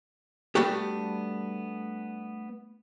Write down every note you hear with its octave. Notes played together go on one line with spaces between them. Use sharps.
G3 A3 B3 D4 F#4 G4